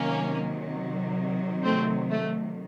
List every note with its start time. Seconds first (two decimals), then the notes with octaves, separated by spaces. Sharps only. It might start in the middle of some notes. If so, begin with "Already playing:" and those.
Already playing: C3 D#3 F#3 A#3 C#4
1.64 A3 C4
2.10 A3